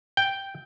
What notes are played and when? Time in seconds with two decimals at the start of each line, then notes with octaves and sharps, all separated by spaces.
0.17 G5